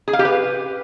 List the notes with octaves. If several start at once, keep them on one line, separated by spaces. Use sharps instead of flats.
G#4
F5
G4
B4